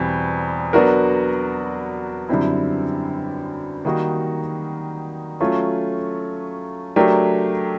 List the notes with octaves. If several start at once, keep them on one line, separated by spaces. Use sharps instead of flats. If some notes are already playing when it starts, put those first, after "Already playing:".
Already playing: E2 B2 G3 C4
F#3 B3 D4 F#4 A#4
F#2 D3 G3 C4 E4
D#3 G3 A#3 D#4 F#4
F#3 A3 C#4 F4
F#3 A3 D4 G4 A#4